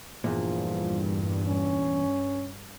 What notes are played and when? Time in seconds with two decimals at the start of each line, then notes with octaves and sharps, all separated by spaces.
0.24 E2 G2 A#2 F3
1.47 C#4